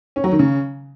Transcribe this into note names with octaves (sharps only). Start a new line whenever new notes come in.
C#4
F#3
D#3
C#3